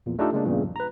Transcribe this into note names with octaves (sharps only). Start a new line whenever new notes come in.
A#1 E2 A#2
A3 D4 D#4 F4 G4 A4
C#3 G#3 A#3 D4
E2 G2 A#2 C#3
A#1
B4 A#5